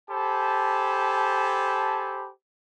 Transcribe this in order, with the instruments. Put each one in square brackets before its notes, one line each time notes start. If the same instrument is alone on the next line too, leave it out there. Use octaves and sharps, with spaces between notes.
[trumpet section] G4 A4 C5 G#5 A5 B5